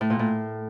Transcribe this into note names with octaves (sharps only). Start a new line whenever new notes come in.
A2
A#2
A2